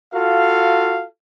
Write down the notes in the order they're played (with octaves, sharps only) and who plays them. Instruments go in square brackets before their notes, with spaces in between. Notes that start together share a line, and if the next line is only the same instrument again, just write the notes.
[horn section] F4 F#4 A4 F5